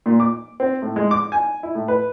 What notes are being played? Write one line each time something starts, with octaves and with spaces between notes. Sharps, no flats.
A#2
D6
C4
A2
G#3
D6
G#5
E4
A2
B4